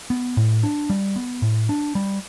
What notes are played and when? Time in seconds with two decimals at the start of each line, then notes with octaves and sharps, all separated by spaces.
0.10 B3
0.37 A2
0.63 D4
0.90 G3
1.16 B3
1.42 A2
1.69 D4
1.95 G3